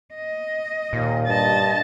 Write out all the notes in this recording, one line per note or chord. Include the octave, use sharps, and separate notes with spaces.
D#5
D#2 A#2
G2 D#5 A5